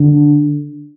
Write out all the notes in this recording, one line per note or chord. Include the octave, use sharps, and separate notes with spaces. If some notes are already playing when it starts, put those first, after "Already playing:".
Already playing: D3